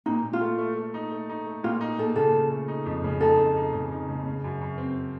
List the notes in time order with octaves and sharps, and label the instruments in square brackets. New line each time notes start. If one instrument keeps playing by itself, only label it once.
[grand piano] A#2 [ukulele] D#4
[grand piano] A#2
[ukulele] F4
[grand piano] A3
A3
A3
D#4
A3
D#4
A3
[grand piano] A#2 [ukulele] F4
[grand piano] D#4
[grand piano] A#2 [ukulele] A4
[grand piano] C#3 [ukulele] A4
[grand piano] C#3
A3
D#4
F2
C#3
[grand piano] D#4 [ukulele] A4
[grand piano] F2
D#4
C#3
D#4
C#3
C#3
F#2
F#2
C4